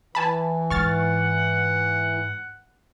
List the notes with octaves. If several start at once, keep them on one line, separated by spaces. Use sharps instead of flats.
E3 G#5 A5 B5
G#2 F#5 C#6 F6 A6